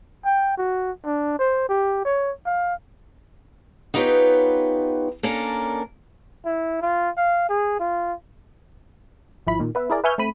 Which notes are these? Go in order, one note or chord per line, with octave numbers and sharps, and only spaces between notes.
G5
F#4
D4
C5
G4
C#5
F5
B3 D#4 F4 G4 B4 C#5
A#3 C#4 D4 A4 A#4
E4
F4
F5
G#4
F4
G#1 F3 E4 B5
A#2 D#3
B3 B4 E5
E4 G#4 A#4 D5
B4 E5 G#5 C#6 F6 G6
A3 C4 B5 D#7